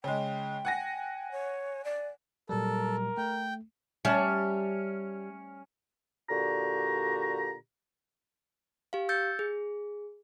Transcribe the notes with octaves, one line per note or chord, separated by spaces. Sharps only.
C#3 G#3 G5
F#5 G#5 A#6
C#5
D5
A#2 F#3 G3 A4 A#4
A3 G5
G3 C#4 E5 A5
A#2 D3 F#4 G4 A#5
G4 F5
E6 G6 A6 C#7
G#4